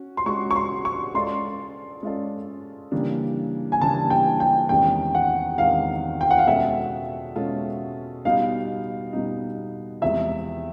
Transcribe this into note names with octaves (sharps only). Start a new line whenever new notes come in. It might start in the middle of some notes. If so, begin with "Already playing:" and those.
Already playing: C#4 F#4
C6
G#3 C#4 F#4 C#6
C#6
C6
C#6
G#3 C#4 F4 A4 D5 C6
G#3 C#4 F4 A4 D5
C#3 E3 G3 A#3 D4
G#5
C#3 E3 G3 A#3 D4 A5
G5
G5
E2 C3 D#3 G#3 C#4 G5
F#5
E2 C3 D#3 G#3 C#4 F5
G5
F#5
F5
B2 G#3 C#4 F4 A4 E5
B2 G#3 C#4 F4 A4
B2 G3 B3 D#4 F5
B2 G3 B3 D#4
E2 C3 F3 G#3 E5